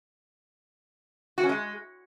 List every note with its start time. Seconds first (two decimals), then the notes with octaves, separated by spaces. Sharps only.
1.38 F#4
1.43 C#4
1.49 G#3